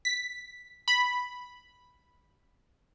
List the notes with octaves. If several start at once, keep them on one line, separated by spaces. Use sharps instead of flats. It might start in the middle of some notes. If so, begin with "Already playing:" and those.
B6
B5